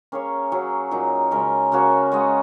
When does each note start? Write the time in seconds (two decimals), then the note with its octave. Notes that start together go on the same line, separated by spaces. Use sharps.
0.12 A#3 C#4 G#4 C#5
0.52 F#3 C#4 G#4
0.91 A#2 F#3 D#4
1.31 C#3 G#3 C#4 A#4
1.72 C#3 A#3 F#4 C#5
2.12 G#3 F#4 D#5